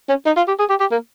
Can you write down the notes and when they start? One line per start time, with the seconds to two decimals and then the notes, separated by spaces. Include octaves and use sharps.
0.09 C#4
0.26 D#4
0.37 F4
0.48 G4
0.59 G#4
0.69 G4
0.80 G4
0.92 A#3